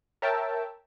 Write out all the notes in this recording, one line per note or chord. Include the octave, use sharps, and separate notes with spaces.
A#4 C#5 E5 G5 A5